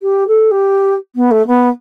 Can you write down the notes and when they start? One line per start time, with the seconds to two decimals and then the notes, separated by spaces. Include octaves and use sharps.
0.02 G4
0.28 A4
0.51 G4
1.16 B3
1.31 A3
1.47 B3